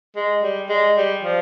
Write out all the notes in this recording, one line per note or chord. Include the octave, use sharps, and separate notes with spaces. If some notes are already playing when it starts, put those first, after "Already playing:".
G#3
G3
G#3
G3
F3